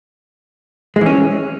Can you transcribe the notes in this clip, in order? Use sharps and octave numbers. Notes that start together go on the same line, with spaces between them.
G#3
E3
C#4